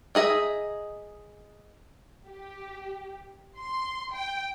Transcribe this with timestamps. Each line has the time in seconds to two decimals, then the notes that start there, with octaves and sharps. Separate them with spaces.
0.15 D#4 G#4 D#5 E5
2.27 G4
3.57 C6
4.13 G5